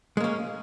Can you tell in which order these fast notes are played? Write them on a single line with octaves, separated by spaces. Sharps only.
G#3 A#3 C#4